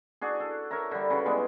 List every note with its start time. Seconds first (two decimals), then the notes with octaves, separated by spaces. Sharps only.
0.21 D4 F#4 G#4
0.40 A4
0.71 A#4 C#5 E5 A#5
0.91 D3 G3
1.10 C#3 F#4 B4
1.26 G3 G#3 B3